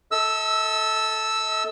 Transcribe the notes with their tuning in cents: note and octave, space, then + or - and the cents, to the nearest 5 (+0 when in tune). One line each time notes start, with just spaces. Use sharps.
A4 +0 D#5 +45 E6 +0